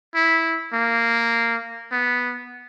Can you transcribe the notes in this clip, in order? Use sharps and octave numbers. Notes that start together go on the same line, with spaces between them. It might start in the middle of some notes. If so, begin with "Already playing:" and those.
E4
A#3
B3